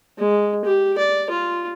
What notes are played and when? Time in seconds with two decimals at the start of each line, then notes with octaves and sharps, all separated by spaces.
0.18 G#3
0.65 G4
0.98 D5
1.30 F4